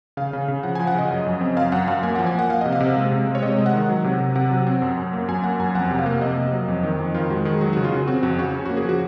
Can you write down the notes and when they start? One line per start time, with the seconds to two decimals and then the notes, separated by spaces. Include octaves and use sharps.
0.17 C#3 F5
0.33 C#3
0.48 C#3
0.63 F3 F#5
0.75 F3 G#5
0.87 F#5
0.95 C#3 D#5
1.10 F#2
1.26 F#2
1.41 C4
1.57 F#2 F5
1.72 F#2 F#5
1.88 F#2 F5
2.03 A#3 G#5
2.15 F3 F#5
2.27 G#5
2.34 A#3 F#5
2.50 A#3 F5
2.61 C3 D#5
2.73 F5
2.80 C3
2.96 G#3
3.12 C3
3.27 G#3
3.35 C#5
3.42 C3 D#5
3.58 G#3
3.66 F#5
3.74 D#3
3.89 F#3
4.04 C3
4.20 C3
4.36 C3 F#5
4.51 F#3
4.67 C4
4.82 F#2
4.97 F#2
5.13 A#3
5.28 F#2 G#5
5.44 A#3 F#5
5.60 F#2 G#5
5.75 F2 F#5
5.91 C3
5.99 F5
6.06 A#3
6.21 C3 D#5
6.37 A#3
6.53 F#3
6.68 F2
6.83 D#3
6.99 F2
7.14 D#3 F4
7.30 G#3 F#4
7.45 D#3 G#4
7.61 F#3 F#4
7.73 C#3 F#4
7.84 F4
7.92 C#3 F#4
8.07 C4 F#4
8.23 F2 F#4
8.38 C#3 F#4
8.54 C#4
8.65 A#3 F#4
8.77 G#4
8.85 F3 F#4